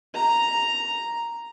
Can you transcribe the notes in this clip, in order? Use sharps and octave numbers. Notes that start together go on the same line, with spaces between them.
A#5